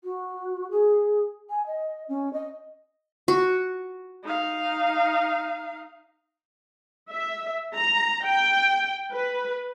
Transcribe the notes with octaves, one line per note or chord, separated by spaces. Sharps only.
F#4
G#4
G#5
D#5
C#4
D#5
F#4
D#4 F5
E5
A#5
G5
B4